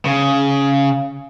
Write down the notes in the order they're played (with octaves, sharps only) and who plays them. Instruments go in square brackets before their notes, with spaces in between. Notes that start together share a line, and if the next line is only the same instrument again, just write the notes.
[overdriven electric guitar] C#3